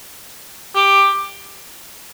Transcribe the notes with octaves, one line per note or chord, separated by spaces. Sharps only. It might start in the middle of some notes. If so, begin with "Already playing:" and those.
G4